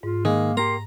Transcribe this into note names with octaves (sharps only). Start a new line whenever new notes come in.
G#2 F4
D#3 G#3 A#3
A#3 G4 A#5 C6